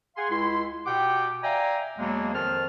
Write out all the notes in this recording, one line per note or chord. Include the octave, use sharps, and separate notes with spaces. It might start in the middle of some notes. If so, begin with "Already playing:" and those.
G#4 F5 F#5 G#5 C6
C#2 E4 C6
B2 G4 F#5 G5 D6
D5 E5 F5 G5 G#5 A#5
E2 B2 F#3 G#3 A#3
F2 D#3 F3 C5 A5 F6